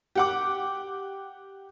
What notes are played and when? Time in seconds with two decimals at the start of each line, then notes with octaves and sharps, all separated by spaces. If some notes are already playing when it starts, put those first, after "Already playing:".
0.15 G4 F#5 D6